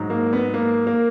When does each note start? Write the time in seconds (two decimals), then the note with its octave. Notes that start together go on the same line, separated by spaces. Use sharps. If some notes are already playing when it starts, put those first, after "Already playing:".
Already playing: G#2 F#3
0.10 A#3
0.33 B3
0.54 A#3
0.87 A#3